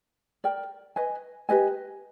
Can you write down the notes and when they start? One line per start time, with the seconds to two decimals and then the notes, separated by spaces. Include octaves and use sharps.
0.44 A#4 D5 G5
0.96 B4 D#5 G#5
1.49 G4 B4 D#5 G#5